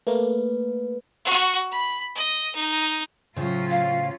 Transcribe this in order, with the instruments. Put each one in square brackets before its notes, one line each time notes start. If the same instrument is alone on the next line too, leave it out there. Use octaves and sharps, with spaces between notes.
[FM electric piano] A3 A#3 [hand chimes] B4
[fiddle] F#4
B5
D#5
D#4
[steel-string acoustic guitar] A2 C#3 C5 [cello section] F#3 C#4 F4
[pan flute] F5